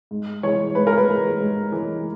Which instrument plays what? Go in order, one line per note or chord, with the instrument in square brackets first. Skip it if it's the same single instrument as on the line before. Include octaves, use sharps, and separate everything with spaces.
[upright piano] G#2
E3 G#3 C#5
G#2 B4
A#4
B4
E3 G#3
G#2
E3 G#3